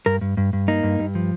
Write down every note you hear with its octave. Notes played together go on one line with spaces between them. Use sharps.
G2 A#4
G2
G2
G2
A#3 D#4
G2
G2
F3